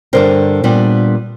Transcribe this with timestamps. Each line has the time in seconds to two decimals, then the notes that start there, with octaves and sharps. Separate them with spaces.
0.13 G2 D3 G3 A#4 C5
0.64 A#2 G3 B3 D4